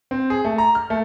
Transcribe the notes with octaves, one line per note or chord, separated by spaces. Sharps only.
C4
G#4
A3
A#5
F6
A3